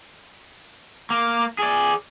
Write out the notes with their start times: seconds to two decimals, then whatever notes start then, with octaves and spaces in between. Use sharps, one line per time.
1.10 A#3 D6
1.59 G#4 D5 G#5